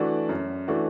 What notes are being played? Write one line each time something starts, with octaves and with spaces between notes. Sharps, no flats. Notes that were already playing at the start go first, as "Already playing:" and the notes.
Already playing: E3 A3 D4 F#4
F#2
E3 A3 D4 F#4